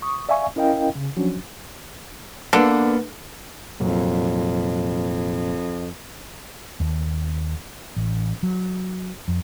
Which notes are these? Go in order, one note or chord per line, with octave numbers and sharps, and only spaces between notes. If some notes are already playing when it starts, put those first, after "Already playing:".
C#6 D#6
D5 E5 F5 G#5 C#6
C#4 E4 A#4 D#5 F5 G5
C#3
F3 F#3 C#4 D4 F#4
D3 A#3 B3 D4
F1 F2 A#2 F#3
D#2
A1
F#3
F2